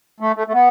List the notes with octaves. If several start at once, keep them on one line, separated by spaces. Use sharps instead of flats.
A3
A3
A3
B3